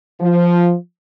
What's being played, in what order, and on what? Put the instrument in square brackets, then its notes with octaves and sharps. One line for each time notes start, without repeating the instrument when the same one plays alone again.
[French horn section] F3